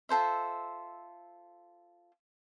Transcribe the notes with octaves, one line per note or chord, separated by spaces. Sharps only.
F4 A4 C5 E5